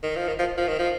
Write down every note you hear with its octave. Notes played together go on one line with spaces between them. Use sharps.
D#3
F3
D#3
F3
F3
D#3
F3